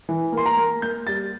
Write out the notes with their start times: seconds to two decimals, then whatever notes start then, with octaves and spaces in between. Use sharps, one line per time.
0.09 E3
0.32 A#3
0.37 C6
0.45 A#5
0.57 A#3
0.82 A#3 G6
1.07 G3 A6